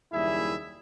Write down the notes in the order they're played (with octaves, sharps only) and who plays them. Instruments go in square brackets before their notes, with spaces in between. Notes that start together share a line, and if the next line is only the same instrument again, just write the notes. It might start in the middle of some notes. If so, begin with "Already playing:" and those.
[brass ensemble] F#1 D#2 G3 E4 G#4 E5